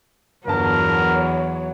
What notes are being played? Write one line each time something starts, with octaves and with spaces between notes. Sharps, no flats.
G1 E2 F#3 A#4 A5
C#5